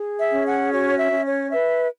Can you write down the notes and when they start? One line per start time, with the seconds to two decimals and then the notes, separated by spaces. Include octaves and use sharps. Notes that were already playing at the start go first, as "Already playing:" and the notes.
Already playing: G#4
0.19 E5
0.32 C#4
0.45 F#5
0.71 F#4 C#5
0.98 E5
1.12 C#4
1.25 C#5
1.51 B4 E5